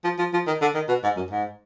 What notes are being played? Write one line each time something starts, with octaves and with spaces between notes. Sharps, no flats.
F3
F3
F3
D#3
D3
D#3
B2
G#2
F#2
G#2